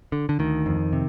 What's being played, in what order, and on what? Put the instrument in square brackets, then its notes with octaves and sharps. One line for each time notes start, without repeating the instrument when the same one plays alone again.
[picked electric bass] D3
D3
D2 D#3
F2
C3